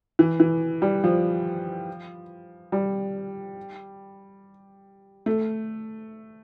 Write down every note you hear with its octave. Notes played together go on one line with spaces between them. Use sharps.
E3
E3
G3
F3
G3
A3